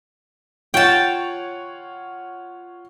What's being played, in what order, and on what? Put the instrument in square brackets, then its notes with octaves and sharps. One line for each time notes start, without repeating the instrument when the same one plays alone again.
[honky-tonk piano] F4 C#5 F#5 [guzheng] G5 A5